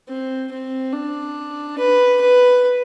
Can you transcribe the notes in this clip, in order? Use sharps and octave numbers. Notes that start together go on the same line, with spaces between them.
C4
C4
D4
B4
B4